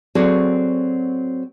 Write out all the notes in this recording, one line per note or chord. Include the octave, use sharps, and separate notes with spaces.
F#3 C4 F#4 G#4 A4 D5